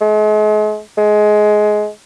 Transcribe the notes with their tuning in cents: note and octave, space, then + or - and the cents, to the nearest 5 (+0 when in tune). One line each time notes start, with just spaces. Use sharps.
G#3 +40
G#3 +20